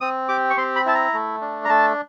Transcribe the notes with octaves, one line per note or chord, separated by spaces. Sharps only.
C4 D#6
G4 D6
C#6
C4 C6
B5
E4 A5
A#5
A3
D4
A#5
A3 A5